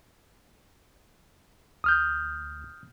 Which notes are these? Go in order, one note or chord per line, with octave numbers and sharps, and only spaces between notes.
D2 D#6 F6 G6